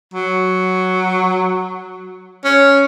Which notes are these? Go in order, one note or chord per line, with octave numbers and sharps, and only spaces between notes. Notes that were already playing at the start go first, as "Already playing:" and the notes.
F#3
C#4